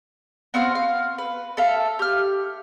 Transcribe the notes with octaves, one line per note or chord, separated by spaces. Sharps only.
B3 C4 F#4 F5
F5
B4
A4 E5 F5
G4 F6